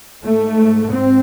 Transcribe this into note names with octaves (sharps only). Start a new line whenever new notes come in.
G#2 A3
C4